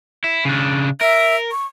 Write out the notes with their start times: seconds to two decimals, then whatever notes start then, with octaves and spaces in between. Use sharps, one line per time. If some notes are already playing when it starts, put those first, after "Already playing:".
0.24 E4
0.45 C#3 D4
1.01 A#4 E5
1.51 C#6